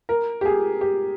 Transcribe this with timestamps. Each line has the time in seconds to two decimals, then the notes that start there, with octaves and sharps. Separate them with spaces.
0.09 A#4
0.41 G4
0.45 G#4
0.81 G4